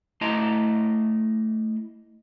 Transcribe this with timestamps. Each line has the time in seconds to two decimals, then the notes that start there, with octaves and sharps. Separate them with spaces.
0.21 A3 E4 D#5 A5 A#5 C6